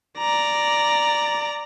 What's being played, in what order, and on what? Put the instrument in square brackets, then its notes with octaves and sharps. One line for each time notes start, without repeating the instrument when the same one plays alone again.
[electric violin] D5 A#5